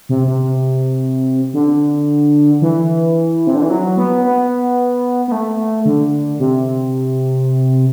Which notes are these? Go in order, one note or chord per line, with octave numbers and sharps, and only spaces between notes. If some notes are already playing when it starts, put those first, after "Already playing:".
C3
C3
D3
E3
C3
D3
E3
F#3
B3
B3
B3
A3
D3
C3